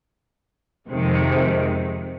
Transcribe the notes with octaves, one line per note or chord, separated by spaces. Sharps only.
F2 C3 D#3 G#3